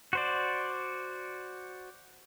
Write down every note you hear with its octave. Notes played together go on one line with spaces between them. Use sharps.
F#4 C5 D5